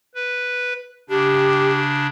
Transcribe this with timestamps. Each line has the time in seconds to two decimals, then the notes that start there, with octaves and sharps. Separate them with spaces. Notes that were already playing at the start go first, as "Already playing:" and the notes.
0.15 B4
1.09 C#3 D4 G4